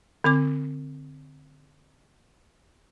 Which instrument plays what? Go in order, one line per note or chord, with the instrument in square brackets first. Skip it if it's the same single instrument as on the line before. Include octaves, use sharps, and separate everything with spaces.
[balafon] D3 C4 D6